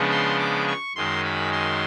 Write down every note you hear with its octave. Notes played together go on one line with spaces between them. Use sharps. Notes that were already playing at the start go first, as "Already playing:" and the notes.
Already playing: C#3 F3 G#3 B3 D4
C6
D6
C#6
F#2 D#3 G#3 C6
B5
C6